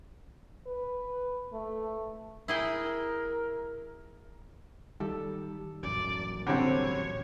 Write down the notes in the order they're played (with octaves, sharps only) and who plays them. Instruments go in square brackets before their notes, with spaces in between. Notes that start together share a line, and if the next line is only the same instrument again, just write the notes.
[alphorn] B4
A3
[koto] E4 G#4 G5 [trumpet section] A#4
[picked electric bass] D#3 G3 [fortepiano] A4
[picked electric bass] D#1 A1 F#2 [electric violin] D5
[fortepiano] D3 G3 C4 [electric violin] C#5